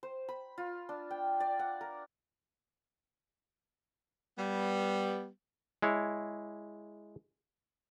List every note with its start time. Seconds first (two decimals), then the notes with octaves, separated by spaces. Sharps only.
0.03 C5
0.29 B5
0.58 F4
0.89 D4
1.11 G5
1.40 D5
1.59 F#5
1.81 A#4
4.38 G3 B3
5.82 G#3 E4 C#5